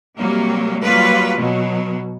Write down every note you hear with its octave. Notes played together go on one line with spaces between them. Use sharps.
C3 F#3 G3 A#3
F#3 G3 A#3 F4 B4 D5
B2 F#3